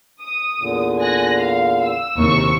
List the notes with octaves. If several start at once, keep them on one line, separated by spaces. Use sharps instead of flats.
D#6
E2 A#2 D3
G#5 F#6 A#6
F5
E6
D#2 G#2 C3 E4 C#6